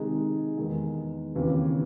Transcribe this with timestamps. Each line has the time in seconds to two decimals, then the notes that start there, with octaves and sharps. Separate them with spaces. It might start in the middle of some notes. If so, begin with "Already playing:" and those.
Already playing: C3 D#3 G#3 D#4 G#4
0.57 E2 D#3 G#3
1.35 D#2 C#3 E3 C4